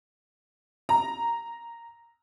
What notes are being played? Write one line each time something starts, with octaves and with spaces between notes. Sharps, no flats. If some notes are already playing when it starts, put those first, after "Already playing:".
A#5